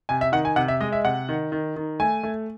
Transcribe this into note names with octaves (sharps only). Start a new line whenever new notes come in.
C3 G#5
E5
D#3 F#5
G#5
C3 F#5
E5
G#3 D#5
E5
C3 F#5
D#3
D#3
D#3
A3 G#5
A3